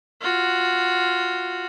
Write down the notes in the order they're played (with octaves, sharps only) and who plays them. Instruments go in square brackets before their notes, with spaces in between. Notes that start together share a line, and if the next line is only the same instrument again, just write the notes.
[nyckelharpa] F4 F#4